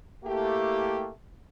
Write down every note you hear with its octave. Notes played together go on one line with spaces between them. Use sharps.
A3 A#3 E4 G4